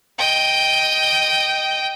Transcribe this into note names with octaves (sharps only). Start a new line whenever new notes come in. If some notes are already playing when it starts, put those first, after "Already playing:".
D#5 G5